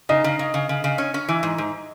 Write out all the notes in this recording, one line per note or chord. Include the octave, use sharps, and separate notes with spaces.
C#3 D#4 D#5
C#3
C#3
C#3
C#3
C#3
C#4
C#4
E3
G#2
G#2